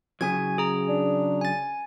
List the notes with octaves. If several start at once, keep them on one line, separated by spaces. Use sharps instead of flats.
C#3 F#3 C#4 G#5 G#6
G#4 A#5
D4
G#5 A6